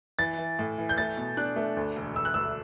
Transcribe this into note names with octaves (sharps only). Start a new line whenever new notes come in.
E3 A6
E3
A2
E3
G6
A3 A6
B2
D4 F#6
A3
D2
E1
E1 E6
F#6
D2 E6